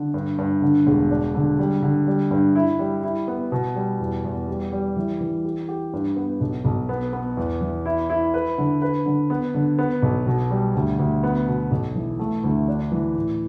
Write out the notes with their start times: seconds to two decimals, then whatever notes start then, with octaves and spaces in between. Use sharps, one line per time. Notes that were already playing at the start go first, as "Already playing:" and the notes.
Already playing: D3
0.14 G2
0.38 G2
0.62 D3
0.87 E1
1.11 D4
1.35 D3
1.59 G3
1.83 D3
2.07 G3
2.31 G2
2.56 E4
2.79 G3
3.03 E4
3.28 B3
3.52 B2
3.75 G3
4.00 E2
4.25 E2
4.48 G3
4.72 G3
4.96 E3
5.21 E3
5.45 G4
5.68 G4
5.93 G2
6.16 B3
6.41 B1
6.65 B1
6.89 B3
7.13 B3
7.37 E2
7.61 E3
7.86 E4
8.10 E4
8.34 B4
8.58 D3
8.82 B4
9.06 D3
9.30 B3
9.54 D3
9.79 B3
10.03 B1
10.27 B2
10.51 G3
10.75 D2
10.99 D2
11.23 B3
11.47 B2
11.71 B1
11.95 E3
12.19 A3
12.44 D2
12.68 D4
12.92 E3
13.16 A2